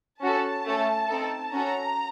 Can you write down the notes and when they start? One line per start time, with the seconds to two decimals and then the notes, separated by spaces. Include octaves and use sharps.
0.21 C#4 F#4 A4 A5
0.65 A3 C#4 A4
1.09 C4 D#4 A4
1.52 C#4 F#4 A4 A#5